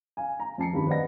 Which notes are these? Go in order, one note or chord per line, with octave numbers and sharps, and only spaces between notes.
F5 G#5
A#5
F2 A5 C7 C#7
G#1 G2 D#3 F3 G4 B5
B4 C5 D5 D#5 F#5 A#6